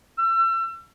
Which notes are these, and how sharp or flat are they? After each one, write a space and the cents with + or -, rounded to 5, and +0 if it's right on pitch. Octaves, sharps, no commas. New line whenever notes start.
E6 +35